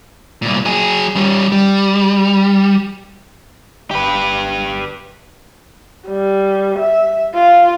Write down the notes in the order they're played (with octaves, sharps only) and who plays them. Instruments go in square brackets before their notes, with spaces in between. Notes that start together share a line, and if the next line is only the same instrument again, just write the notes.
[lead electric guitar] C2 A#2
F#3 G#4
G3 C#4
G3
[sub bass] G1 [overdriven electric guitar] G4 B4
[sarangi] G3
E5
F4